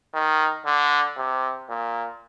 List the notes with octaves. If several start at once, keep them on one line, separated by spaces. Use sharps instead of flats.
D#3
D3
C3
A#2